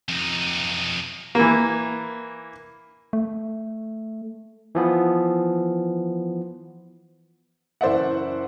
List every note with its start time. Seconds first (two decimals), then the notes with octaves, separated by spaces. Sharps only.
0.09 F2 D#4
1.35 E3 A#3
3.13 A3
4.75 E3 F3 B3
7.81 F#1 E3 C5 D5 E5 F#5